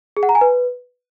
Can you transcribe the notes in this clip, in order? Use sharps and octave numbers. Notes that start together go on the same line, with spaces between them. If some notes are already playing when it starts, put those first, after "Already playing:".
G#4
F#5
A#5
G#5
B4